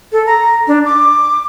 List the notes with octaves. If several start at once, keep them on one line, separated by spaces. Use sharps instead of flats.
A4
A#5
D4
D6